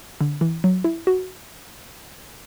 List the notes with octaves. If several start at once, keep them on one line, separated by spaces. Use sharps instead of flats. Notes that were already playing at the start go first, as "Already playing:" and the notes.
D3
E3
F#3
E4
F#4